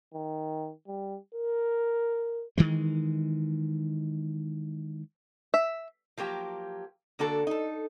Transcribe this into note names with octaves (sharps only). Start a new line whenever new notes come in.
D#3
G3
A#4
D#3 E3 G#3
E5
F3 F#3 A#3 G4
D3 A#3 D4 F#4 A4
D#4 A4